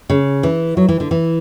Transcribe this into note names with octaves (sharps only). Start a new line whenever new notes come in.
C#3
E3
F#3
E3
D3
E3